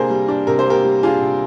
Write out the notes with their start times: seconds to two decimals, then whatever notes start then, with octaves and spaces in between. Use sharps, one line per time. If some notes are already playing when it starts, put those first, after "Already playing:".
Already playing: C3 A#3 D4 G#4 A#4 C5
0.10 G3
0.28 D4
0.47 C3 A#4
0.59 C5
0.66 A#3 G4 A#4
0.84 G3
1.03 D4 F4 G#4
1.21 C3